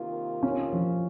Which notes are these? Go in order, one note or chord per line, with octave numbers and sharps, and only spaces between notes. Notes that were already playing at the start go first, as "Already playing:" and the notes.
Already playing: C3 D#3 A#3 F4
C#4
F3